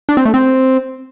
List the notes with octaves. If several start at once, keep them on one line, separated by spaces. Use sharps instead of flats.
D4
C4
A3
C4